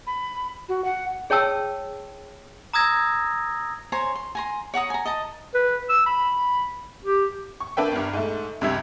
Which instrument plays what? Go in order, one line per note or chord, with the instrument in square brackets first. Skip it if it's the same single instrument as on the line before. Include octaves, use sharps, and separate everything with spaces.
[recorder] B5
F#4
F#5
[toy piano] G#4 C#5 G5 A5 E6
[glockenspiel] A#5 D#6 E6 G#6 A#6
[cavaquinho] C5 C#5 G#5 A#5
C6
G#5 A#5 C6
C#5 F#5 A#5 D#6
G#5 A#5
D#5 A5 A#5
[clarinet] B4
E6
B5
G4
[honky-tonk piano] C#6
A#3 D4 B4 E5 G5
G1 G2
G#2 A3
C#2 G2 C3 G3 E5 G#6